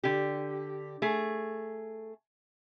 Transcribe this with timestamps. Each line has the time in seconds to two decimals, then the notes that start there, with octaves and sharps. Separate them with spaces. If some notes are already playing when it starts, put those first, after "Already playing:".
0.03 D3 G4
1.02 A3 G#4